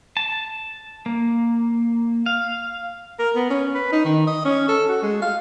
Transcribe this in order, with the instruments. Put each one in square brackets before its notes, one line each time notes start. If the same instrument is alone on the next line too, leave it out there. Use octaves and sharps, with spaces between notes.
[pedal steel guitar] A5
A#3
F5
[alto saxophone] A#4
B3
C#4
B4
D#4
D#3
D#5
C#4
A4
F#4
G#3
F5